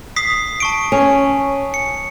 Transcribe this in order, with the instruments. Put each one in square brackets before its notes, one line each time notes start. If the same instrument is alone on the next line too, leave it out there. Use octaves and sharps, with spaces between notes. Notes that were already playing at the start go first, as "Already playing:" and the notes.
[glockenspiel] D#6 B6 C7
A5 C#6 D7
[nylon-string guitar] C#4
[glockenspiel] C#7